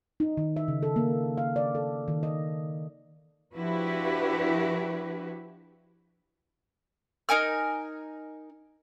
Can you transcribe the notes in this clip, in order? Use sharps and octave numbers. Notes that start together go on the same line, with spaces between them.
D#4
D#3
E5
C#3
A4
A#3
F5
D5
A4
D#3
D#5
F3 D4 E4 F#4 G4 B4
D#4 A#4 G#5 F6